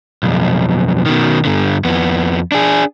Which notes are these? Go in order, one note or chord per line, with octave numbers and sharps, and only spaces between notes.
B1 F2
B2 D#3
G2 D3
F2 B3
D4 G#4